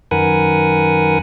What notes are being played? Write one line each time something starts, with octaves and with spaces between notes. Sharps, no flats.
F#2 D#3 A#4 B4 F#5 G#5